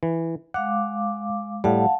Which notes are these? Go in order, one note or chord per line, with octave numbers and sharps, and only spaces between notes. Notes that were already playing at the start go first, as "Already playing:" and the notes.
E3
G#3 F5 F#5 D6
A2 G3 F5 F#5 A5